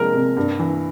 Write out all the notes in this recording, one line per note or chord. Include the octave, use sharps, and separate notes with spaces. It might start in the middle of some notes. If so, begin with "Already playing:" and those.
Already playing: C3 F3 G#3 A#4
C3
G2
E3